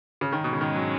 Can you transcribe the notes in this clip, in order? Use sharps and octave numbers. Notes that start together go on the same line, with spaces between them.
C#3
G#2 D#3 G#3 C#4
B2
C#3
D#3
F#3